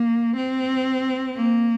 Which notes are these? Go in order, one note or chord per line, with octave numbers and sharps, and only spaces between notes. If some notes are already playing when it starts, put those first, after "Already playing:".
Already playing: A#3
C4
A#3